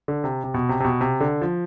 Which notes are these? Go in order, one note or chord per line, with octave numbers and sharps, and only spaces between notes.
D3
C3
C3
B2
C3
C3
B2
C3
D3
F3